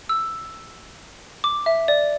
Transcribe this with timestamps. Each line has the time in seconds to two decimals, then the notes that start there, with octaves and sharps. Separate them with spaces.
0.09 E6
1.44 D6
1.66 E5
1.88 D5